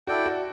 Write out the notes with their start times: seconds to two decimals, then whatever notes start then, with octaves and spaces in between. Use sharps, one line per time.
0.07 E4 F#4 A4 D5 G5
0.26 F#4